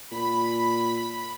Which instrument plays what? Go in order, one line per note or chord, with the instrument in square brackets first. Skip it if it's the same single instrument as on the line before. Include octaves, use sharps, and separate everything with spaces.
[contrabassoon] A#2 [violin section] B5